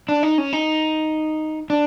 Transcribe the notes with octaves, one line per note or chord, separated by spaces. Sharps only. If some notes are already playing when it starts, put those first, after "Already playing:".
D4
D#4
C#4
D#4
D4